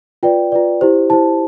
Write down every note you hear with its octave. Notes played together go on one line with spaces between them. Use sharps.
F4 B4 D5 G5
F4 B4 D5
E4 G4 C5
E4 G4 C5 A5